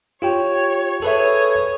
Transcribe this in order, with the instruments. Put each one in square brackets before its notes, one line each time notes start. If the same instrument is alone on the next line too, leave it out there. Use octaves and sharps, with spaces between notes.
[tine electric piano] F4 G4 G5 [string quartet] C#5
[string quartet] G#4 C#5 [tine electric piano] A4 B4 E5